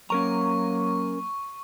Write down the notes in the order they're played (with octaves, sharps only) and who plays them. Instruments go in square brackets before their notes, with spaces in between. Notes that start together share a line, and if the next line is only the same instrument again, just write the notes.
[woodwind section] F#3 A#3 [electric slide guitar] C#4 A#4 A#5 [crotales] C#6